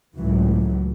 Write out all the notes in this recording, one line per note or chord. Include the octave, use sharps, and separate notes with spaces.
C#2 A2 E3 F#3